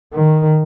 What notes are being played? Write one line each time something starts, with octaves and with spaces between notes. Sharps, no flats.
D#3